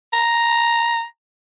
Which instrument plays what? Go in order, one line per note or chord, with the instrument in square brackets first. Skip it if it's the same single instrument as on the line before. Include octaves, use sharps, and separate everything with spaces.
[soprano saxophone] A#5